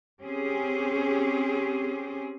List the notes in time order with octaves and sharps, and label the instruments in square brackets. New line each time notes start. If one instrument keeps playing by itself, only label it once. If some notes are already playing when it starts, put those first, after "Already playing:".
[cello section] C4 C#4 G4 G#4